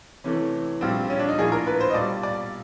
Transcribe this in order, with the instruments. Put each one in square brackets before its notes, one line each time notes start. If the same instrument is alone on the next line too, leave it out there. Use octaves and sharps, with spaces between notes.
[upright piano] C3 E3 A3 [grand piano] C#4
[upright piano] A#1 A#2 G3 [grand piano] C4
[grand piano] C#4
D4
D#4
[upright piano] A#1 A2 F3 A#3 [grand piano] G#4
[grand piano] A#4
B4
C5
D#5
[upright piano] B1 A#2 G3 [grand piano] D5
[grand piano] D5